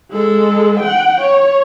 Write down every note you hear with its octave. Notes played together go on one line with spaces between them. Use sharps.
G#3 A4
F#5 G5
C#5